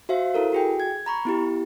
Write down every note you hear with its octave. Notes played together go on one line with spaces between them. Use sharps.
F#4 C5 E5 F5
E4 A4 A#4
F#4 G#4 G5
G#6
A#5 B5 C#6
B3 E4 G4